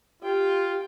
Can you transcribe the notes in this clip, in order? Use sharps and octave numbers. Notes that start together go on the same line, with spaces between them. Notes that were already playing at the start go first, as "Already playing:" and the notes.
F4 G4 G5